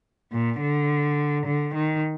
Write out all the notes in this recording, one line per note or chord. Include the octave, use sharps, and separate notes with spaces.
A#2
D3
D3
D#3